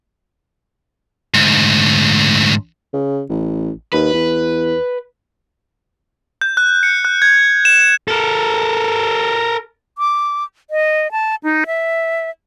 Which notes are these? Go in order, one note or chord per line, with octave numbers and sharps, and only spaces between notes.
D2 G#2
C#3
A1
D#2 B4
E2
G6
F#6
C#7
F#6
G#6
E7
A4 A#4
D6
D#5
A5
D#4
E5